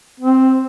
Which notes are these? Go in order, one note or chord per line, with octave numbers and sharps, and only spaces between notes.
C4